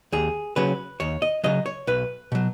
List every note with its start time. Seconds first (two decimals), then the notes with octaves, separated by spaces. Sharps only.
0.12 D#2 G#4
0.56 C#3 F#3 B4
1.00 D#2 C#5
1.22 D#5
1.44 C#3 F#3 D#5
1.66 C#5
1.87 B1 B4
2.32 B2 F#3